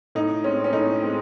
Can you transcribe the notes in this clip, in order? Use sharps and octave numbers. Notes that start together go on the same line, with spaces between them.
A2 D#4
G#3 C4 C#4
C#4
A2 D#4
G#3 C4